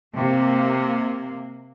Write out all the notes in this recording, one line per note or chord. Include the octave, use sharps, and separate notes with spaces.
C3 A#3